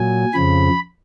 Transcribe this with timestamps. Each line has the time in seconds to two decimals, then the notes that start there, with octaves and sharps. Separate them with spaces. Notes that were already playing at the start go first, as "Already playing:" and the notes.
Already playing: A#2 F#3 G#5
0.34 F2 C#3 F3 B5